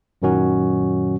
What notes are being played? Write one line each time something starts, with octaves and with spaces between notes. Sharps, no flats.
F#2 A#2 D#3 F#3 C#4 F#4